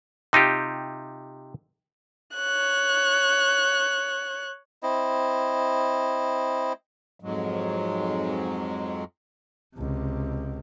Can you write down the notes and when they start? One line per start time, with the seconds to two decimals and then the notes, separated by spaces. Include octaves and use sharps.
0.33 C3 D#4 F4 G4
2.35 C#5 F#6
4.83 C4 E4 D#5
7.20 F2 G#2 F#3 G#3
9.76 C#2 C3